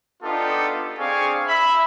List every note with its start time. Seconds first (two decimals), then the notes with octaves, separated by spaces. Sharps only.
0.23 B3 D4 D#4 F4 G4 A4
0.98 C4 D4 G#4 F5 G#5 C#6
1.48 E5 B5